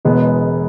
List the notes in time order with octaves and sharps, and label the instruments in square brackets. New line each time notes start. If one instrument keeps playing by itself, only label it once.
[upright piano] E1 E2 B2 G#3 B3